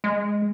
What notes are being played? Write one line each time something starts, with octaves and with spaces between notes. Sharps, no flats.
G#3